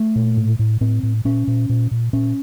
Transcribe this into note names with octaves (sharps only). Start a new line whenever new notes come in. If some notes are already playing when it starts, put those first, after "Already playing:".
Already playing: A3
A#2
A2
A2
A2 C4
A2
A#2 C#4
A#2
A#2
A#2
A#2 C#4